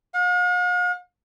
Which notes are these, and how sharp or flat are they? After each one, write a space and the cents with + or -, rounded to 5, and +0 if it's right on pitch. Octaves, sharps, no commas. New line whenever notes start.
F5 +45